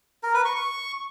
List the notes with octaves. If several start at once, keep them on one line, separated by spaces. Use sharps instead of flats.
A#4
B4
C#6
C#6